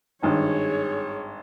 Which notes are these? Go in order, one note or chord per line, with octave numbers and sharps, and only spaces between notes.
G#1 G2 G#4 C#5